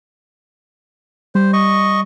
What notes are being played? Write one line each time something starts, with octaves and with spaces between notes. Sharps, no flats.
G3 C5
D#5 C#6